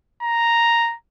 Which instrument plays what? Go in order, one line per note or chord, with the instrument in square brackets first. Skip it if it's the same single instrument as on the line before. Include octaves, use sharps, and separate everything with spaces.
[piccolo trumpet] A#5